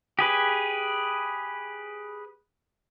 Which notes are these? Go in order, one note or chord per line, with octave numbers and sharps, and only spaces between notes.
G4 G#4 B4